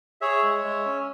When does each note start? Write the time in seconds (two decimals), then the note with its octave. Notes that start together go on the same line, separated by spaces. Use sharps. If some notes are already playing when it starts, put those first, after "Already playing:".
0.21 G#4 C#5 E5
0.43 G#3
0.64 G#3
0.85 C#4